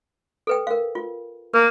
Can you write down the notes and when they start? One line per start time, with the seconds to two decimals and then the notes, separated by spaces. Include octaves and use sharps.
0.47 A4 B4 G5
0.67 A#4 F5
0.95 F4
1.54 A#3 A#4